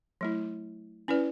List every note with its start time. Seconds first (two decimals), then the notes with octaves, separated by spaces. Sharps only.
0.21 F#3 A3 E4
1.08 C#4 E4 B4 D5